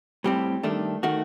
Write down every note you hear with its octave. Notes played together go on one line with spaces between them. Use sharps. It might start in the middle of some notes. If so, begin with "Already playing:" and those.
A2 G3 C4 G4
G2 D#3 A3 D4
D#3 A3 F#4